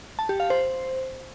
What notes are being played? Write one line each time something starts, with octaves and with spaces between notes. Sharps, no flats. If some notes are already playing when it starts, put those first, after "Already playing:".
A5
G4
F5
C5